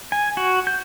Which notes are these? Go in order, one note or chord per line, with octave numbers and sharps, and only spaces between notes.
G#5
F#4
G6